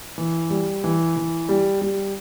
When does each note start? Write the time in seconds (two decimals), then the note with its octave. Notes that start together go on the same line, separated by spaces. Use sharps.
0.18 E3
0.50 G3
0.84 E3
1.16 E3
1.49 G3
1.81 G3